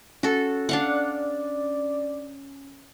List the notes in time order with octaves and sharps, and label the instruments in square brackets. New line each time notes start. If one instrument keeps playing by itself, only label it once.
[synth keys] C#4 [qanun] F#4 A4
[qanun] D4 F5 F#5 [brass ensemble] D5